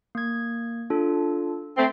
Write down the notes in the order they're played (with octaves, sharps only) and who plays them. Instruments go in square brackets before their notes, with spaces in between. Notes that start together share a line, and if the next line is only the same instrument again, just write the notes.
[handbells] A#3 G#6
D4 F4 A4
[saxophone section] A3 C4